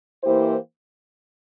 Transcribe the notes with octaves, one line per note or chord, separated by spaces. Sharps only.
E3 A#3 E4 G4 C5